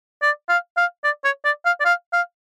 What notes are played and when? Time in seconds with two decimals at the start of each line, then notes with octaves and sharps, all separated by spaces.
0.22 D5
0.49 F5
0.77 F5
1.04 D5
1.24 C#5
1.45 D5
1.65 F5
1.80 D5
1.85 F5
2.13 F5